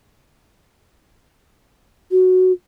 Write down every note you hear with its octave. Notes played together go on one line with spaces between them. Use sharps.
F#4